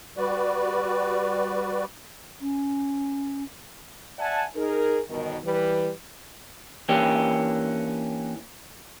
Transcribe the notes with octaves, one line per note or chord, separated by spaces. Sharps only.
G3 F#4 B4 D5
C#4
D5 E5 F#5 G#5 A5
D#4 G#4 A#4
G1 B2 D#3
E3 G3 B4
E3 A#3 C#4 D4 G4